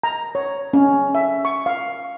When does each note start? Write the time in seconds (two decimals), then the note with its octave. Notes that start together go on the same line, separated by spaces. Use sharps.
0.04 A#5
0.35 C#5
0.73 C#4
1.15 E5
1.45 C#6
1.66 F5